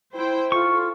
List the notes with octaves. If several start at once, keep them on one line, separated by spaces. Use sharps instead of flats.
E4 C5 G5
F4 A4 C#6